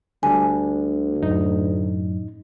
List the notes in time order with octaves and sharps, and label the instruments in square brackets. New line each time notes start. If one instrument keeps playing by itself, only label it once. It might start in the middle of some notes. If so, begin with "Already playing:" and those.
[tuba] D2 [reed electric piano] D3 G3 D4 [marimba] G#5
[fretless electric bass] F#2 A2 [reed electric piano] D#4